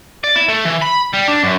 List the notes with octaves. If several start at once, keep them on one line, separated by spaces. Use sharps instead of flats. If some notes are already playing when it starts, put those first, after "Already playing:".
D5
E4
A3
E3
B5
G3
D4
F#2